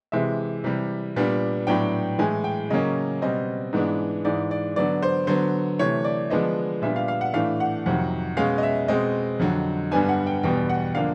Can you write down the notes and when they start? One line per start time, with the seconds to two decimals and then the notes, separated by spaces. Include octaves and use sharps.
0.12 C3 E3 G#3 E5
0.64 C3 E3 G3
1.16 A#2 G3 B3 D4
1.67 A2 F#3 B3 D4 G5
2.18 A2 E3 G#3 G#5
2.44 G5
2.70 C#3 F#3 A#3 C#4 D#5
3.22 B2 G3 C4 D#5
3.73 G#2 E3 G#3 B3 D4
4.25 G#2 E3 G#3 D5
4.51 D5
4.76 D3 F#3 B3 D5
5.02 C5
5.27 D3 F#3 B3 C5
5.79 C3 E3 A3 C#5
6.05 D5
6.30 D3 F3 G#3 B3 D4 D#5
6.82 A#2 G3 B3 D4 E5
6.96 F5
7.08 F5
7.21 F#5
7.33 A2 E3 A3 D4 F5
7.60 F#5
7.86 F2 C3 D#3 F#3
8.37 B2 G#3 C#4 F5
8.58 D#5
8.63 E5
8.88 B2 G#3 C4 D#5
9.39 F2 D3 F#3
9.91 G2 D3 G3 B3 D4 G#5
10.09 F#5
10.27 G5
10.43 E2 B2 G3 B3 G5
10.69 F#5
10.95 D3 F3 A#3 D4 F5